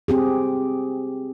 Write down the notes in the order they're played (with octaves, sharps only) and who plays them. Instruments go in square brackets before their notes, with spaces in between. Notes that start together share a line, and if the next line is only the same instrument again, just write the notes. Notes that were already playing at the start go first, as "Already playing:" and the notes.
[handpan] C4 G4 G#4